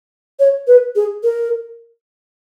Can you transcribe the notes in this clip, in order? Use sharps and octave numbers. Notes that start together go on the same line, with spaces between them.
C#5
B4
G#4
A#4